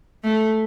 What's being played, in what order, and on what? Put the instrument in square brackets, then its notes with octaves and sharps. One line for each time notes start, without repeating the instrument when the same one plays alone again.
[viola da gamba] A3